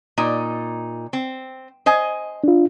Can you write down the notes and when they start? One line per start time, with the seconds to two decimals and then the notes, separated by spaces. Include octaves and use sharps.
0.18 A#2 D#4
1.13 C4
1.86 C5 D#5 G#5
2.44 D4 F4